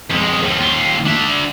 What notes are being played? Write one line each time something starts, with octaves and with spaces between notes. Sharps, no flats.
F2 G#3
D#2 F3
D#2 F4
D4 E5